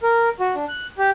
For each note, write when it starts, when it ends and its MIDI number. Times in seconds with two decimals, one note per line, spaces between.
0.03 0.29 70
0.40 0.55 66
0.55 0.65 62
0.69 0.87 90
0.98 1.10 67